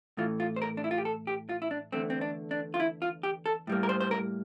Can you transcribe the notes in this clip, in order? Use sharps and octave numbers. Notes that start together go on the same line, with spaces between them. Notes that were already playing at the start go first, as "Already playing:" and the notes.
A2 E3 A3 F4
F4
C5
A#4
D4
E4
F4
G4
A4
G4
F4
E4
D4
E2 D3 A3 C4
C4
D4
D4
F4
E4
F4
G4
A4
A2 G3 A#3
A#4
C5
C5
A#4